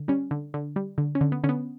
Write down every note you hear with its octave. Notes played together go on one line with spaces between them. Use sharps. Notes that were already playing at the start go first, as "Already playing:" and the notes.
Already playing: D3
G3 C#4
D3
D3
G3
D3
C#4
D3
B3
D3 C#4
B3